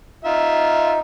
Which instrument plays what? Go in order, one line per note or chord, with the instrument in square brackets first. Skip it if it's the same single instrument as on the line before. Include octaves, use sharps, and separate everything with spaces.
[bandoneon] D#4 [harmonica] F4 E5